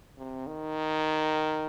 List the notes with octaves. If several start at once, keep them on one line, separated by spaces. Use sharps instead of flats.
C3
D#3